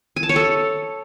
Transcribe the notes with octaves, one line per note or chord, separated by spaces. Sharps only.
G#5
A5
C#5
A4